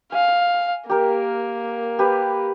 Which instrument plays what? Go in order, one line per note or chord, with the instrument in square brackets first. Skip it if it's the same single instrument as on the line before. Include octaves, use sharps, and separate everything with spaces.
[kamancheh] F5 [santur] G#5
[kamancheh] A#3 [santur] G4 A#4
[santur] G4 B4